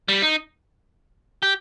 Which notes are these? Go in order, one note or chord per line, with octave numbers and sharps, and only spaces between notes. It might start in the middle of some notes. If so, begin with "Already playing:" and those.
G3
D#4
G4